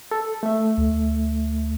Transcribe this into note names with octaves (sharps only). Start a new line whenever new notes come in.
A4
A3 E5
D2